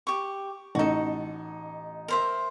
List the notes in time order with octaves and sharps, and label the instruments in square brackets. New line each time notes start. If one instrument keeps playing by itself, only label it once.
[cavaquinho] G4 C#6
[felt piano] A1 D#4 [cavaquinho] F#4 A4
[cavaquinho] A#4 C5 E5